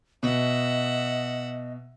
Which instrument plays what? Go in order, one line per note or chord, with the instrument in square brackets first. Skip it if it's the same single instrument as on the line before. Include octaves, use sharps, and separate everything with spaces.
[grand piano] B2 [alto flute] D#5 [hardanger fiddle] E5 F#5